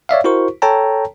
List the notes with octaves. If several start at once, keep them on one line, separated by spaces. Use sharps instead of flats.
C#5 D5 E5 F5
E4 F#4 A#4 C5 C#6
A4 C#5 G5 A5 A#5